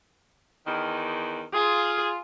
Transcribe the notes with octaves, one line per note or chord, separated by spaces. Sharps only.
E2 D#3
F4 G#4